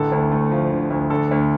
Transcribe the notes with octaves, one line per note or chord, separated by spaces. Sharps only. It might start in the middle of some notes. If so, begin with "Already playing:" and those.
Already playing: A1 D3 A4
D2
A3
F3
D3
D2
D3 A4
D2